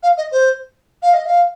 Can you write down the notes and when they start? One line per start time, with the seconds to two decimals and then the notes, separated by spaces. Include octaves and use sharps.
0.03 F5
0.17 D#5
0.32 C5
1.02 F5
1.13 D#5
1.26 F5